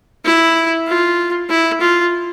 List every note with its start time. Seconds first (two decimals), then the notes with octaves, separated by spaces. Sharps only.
0.25 E4
0.88 F4
1.50 E4
1.81 F4